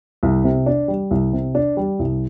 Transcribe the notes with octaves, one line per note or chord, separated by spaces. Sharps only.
C2
C3
D4
G3
C2
C3
D4
G3
C2